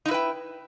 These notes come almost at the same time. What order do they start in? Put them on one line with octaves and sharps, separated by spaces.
D#4 E4 B4 G5